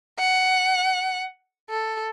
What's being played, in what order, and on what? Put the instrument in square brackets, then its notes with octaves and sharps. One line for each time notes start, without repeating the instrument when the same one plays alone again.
[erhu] F#5
A4